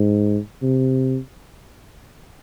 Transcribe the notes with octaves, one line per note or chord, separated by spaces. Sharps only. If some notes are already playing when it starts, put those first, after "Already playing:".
Already playing: G#2
C3